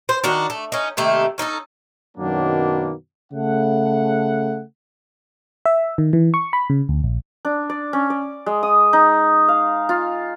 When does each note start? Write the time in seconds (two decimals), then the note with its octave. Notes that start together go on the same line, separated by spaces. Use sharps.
0.09 C5
0.24 D#3 D4 F#4
0.50 A3
0.72 C#4 D#4
0.97 C3 D#3 A3 A#3
1.38 C#4 D#4 F#4 A4
2.18 F#2 B2 D#3 F#3 A#3 D4
3.33 C#3 A3 F#5
5.66 E5
5.98 D#3
6.13 E3
6.34 C#6
6.53 B5
6.70 C#3
6.89 D2
7.04 A#1
7.45 D4
7.70 D5
7.93 C#4
8.10 D5
8.46 G#3
8.63 D#6
8.93 D#4
9.48 F5
9.89 F4